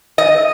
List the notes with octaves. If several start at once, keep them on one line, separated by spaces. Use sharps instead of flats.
D#5